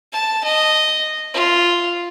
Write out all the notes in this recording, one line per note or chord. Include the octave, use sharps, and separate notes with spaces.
A5
D#5
F4